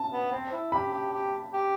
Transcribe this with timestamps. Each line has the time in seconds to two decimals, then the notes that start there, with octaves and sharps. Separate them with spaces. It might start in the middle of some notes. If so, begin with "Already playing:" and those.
Already playing: A5
0.12 B3
0.32 C4
0.52 E4
0.72 G4 B5
0.93 G4
1.13 G4
1.53 G4